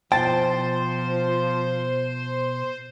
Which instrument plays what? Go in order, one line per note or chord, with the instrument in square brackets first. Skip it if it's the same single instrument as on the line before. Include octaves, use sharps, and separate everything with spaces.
[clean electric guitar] B2 G5 [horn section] F3 [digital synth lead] C5 [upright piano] A5 A6